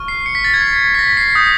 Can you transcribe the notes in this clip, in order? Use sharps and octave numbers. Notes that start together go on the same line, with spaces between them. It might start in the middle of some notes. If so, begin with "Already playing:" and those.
Already playing: C#6 F6
C7
C#7
B6
A6
G#6
B6
A#6
C7
D#6 G6